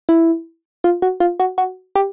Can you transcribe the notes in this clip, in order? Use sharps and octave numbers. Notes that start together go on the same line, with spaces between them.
E4
F4
F#4
F4
F#4
F#4
G4